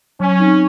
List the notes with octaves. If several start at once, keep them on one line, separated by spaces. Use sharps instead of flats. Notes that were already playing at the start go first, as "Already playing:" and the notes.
F#3 C#4
C4 D#4